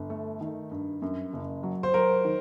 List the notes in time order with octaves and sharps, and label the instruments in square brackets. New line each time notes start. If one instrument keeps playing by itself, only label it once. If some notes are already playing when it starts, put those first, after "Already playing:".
Already playing: [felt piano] G1
A3
D#3
G2
F#2
F#1
F#3
[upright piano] C5
[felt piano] F#3 [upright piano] A#4
[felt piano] D#3